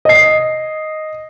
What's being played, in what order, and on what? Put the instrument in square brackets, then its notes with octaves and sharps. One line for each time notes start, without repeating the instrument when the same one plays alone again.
[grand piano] D#5 C7